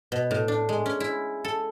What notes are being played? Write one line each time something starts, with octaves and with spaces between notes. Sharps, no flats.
B2
A2
D4
G#3
C#4
E4
A4